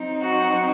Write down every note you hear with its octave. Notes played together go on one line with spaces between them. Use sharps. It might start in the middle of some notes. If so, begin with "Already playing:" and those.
Already playing: F#3 C4 D#4
F#4